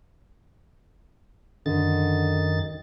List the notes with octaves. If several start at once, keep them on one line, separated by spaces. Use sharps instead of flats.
F#2 D3 D#3 A6